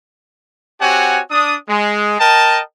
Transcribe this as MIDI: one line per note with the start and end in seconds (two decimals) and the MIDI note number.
0.81 1.21 60
0.81 1.21 66
0.81 1.21 67
0.81 1.21 73
0.81 1.21 78
0.81 1.21 80
1.31 1.57 62
1.31 1.57 87
1.69 2.16 56
2.20 2.60 70
2.20 2.60 75
2.20 2.60 79
2.20 2.60 81